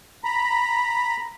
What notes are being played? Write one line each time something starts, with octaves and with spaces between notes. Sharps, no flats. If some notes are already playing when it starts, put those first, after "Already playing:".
A#5 B5